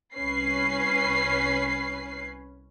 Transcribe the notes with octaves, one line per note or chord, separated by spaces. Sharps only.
C2 C#4 B4 C7